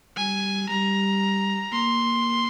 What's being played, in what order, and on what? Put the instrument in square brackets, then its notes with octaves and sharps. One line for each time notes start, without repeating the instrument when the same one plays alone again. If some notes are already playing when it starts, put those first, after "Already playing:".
[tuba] G3 [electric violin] G#5
[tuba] G3 [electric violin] A#5
[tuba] A#3 [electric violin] C6